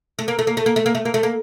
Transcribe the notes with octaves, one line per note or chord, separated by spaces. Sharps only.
A3
A#3
A3
A#3
A3
A#3
A3
A#3
A3
A#3
A3
A#3